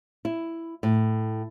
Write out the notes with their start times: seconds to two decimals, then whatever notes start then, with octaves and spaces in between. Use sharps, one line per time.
0.25 E4
0.83 A2